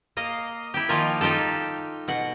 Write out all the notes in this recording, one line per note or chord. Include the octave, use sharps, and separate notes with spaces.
A#3 D#5 F5
E4 G4
D#3 F3 A#3 F4 G#5
D#4 F4 G4 A4
B2 F#5